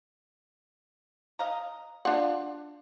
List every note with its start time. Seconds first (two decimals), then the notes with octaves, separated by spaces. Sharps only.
1.39 D#5 F5 A#5
2.05 D4 F4 F#5